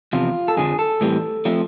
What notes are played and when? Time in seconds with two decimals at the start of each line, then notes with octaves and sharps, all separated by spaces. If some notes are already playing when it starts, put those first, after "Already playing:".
0.13 E2 C3 F3 F4
0.48 A4
0.57 F2 D3 F3 G#4
0.79 A4
1.01 A2 E3 G3 C4
1.45 F3 A3 C4